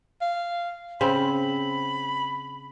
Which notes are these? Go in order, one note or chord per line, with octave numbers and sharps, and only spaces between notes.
F5
C#3 C4 B5